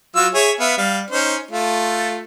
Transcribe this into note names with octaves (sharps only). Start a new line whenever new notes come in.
F#3 F4 E6
G#4 C#5 E5
B3 E5 F5
G3 F5
C#4 D#4 C5
A3 F4